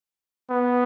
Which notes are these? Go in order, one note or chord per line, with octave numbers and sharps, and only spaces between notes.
B3